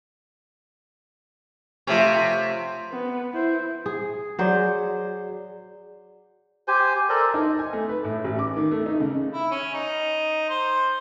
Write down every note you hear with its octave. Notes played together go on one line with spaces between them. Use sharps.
C3 F3 A3 C#4
B3
E4 C5
G#4
F#3 F#4 G#4 C5 D5
G4 C5 G#5
A4 A#4 C5 D5
D#4
G#5
A3
B4
A2
A1
D6
D#3
A3
D#4
C#3
E4
C#4
D#4
C5